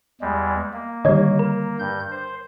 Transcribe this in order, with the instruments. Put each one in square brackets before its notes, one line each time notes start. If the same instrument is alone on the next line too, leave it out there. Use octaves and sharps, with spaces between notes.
[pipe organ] E2 G3 G#3
A#3
[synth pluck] D3 D#3 G3 [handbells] C#5 D#5
[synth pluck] A#4
[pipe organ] G2 G6
C5